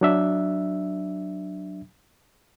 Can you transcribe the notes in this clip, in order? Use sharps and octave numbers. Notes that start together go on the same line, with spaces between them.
F#3 D4 E5